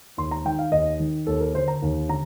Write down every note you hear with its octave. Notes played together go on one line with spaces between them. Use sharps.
D#2 C6
A#5
D#3 G5
F5
D#2 D#5
D#3
D#2 A4
A#4
D3 C5
A#5
D#2
D3 A#5